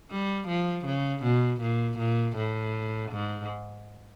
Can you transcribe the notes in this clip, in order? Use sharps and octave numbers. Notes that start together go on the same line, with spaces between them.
G3
F3
C#3
B2
A#2
A#2
A2
G#2